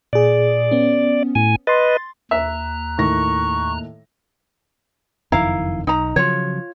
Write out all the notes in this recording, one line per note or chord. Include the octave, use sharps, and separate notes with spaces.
A#2 G#4 D5
B3 C#4
A2 G#5
B4 D#5 C6 A6
D#2 E5 A#5 F#6
A2 D#3 C#6 A#6
F#1 F2 D#3 E4 F5 A#5
B1 D#4 A#5
C#3 F3 F#3 F4 C#5